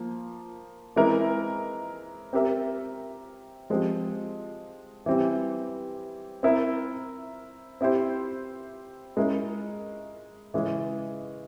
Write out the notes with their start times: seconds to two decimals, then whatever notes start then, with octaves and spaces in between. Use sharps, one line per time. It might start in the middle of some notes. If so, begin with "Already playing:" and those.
Already playing: F3 A#3
0.96 E3 G#3 C4 E4 A#4
2.33 C4 G4 A#4 E5
3.70 F3 G#3 C4 G4
5.06 E3 G3 C4 G4
6.43 C4 E4 A#4
7.81 C4 E4 G4 C5
9.17 G#3 C#4 E4 A#4
10.54 C#3 E3 G#3 C#4